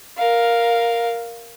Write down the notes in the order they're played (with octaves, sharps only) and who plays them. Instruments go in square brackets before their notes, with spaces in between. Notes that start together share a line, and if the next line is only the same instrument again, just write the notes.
[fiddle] A#4 F5